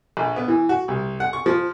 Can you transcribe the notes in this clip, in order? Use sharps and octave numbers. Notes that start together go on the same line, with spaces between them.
A#1
B3
E3
F#4
C2
F#5
C#6
F3